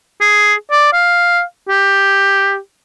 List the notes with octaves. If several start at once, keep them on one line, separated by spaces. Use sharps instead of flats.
G#4
D5
F5
G4